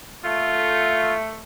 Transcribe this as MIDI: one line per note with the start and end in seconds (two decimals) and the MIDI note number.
0.25 1.43 57
0.25 1.14 65